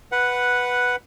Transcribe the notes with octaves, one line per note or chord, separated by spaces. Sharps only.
B4 F#5